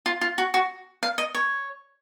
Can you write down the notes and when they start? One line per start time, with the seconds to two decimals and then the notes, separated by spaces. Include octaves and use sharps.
0.06 F4
0.21 F4
0.38 F#4
0.54 F#4
1.03 F5
1.18 D#5
1.35 C#5